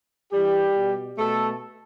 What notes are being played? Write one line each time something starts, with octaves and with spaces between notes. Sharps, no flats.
G2 E3 G3 G4
B2
B2 A3 A4